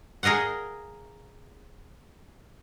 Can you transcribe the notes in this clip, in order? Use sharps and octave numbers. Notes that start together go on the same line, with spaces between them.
G#4 A#4 D#5 F5 F#5